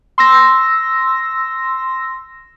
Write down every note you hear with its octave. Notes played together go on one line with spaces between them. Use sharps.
C6 E6 A#6